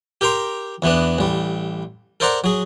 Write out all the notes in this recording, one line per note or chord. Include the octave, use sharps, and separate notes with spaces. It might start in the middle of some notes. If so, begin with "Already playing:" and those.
G4 A#4 G5 A#5 C6
E2 E3 B3 D4
A1 G3
A4 A#4 C5 D5 F#5 A#5
F#3 G#4